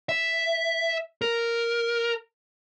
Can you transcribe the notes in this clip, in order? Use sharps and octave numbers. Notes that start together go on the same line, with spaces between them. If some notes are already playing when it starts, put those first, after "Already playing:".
E5
A#4